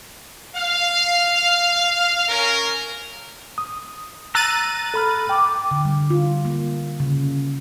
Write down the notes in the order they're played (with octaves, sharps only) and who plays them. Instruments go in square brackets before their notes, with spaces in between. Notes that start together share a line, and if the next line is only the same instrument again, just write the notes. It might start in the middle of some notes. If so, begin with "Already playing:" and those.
[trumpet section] F5
C#4 A#4
[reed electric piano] D#6
[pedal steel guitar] A#5 E6 [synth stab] F#6 A6 D#7
[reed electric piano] A4 B5 F6
[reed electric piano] G5 [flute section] D6
[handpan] D3
G3
F4
A#3
C#3